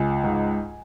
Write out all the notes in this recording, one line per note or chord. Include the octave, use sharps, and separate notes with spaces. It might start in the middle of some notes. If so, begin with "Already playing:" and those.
Already playing: C#2 G#5
G#2